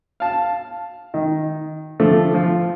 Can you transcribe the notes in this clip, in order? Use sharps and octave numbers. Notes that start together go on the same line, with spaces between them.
F5 A5
D#3
D3 F3 A3
F3 F4